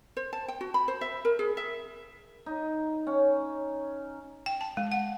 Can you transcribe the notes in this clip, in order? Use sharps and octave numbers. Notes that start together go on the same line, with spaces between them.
C5
A5
G5
F#4
B5
C5
E5
A#4
G#4
E5
D#4
C#4
G5
A5
G#3
F#5